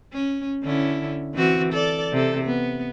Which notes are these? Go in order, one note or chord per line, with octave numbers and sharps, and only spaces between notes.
C#4
D3 C#4 E4
E3 C4 F#4
A4 D5
C3 A4
B3